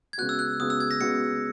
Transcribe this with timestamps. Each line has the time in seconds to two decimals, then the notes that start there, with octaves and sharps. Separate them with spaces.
0.13 G#6
0.18 C#3 G#3 B3 F#4 F#6
0.29 E6
0.39 F#6
0.60 C#3 G#3 B3 F#4 D#6
0.70 E6
0.80 G#6
0.91 A#6
1.01 C#3 G#3 B3 F#4 C#7